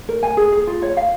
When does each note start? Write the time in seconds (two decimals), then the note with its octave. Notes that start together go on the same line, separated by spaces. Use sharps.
0.09 A#4
0.23 G#5
0.37 G#4
0.52 G#4
0.67 F4
0.82 C#5
0.97 F5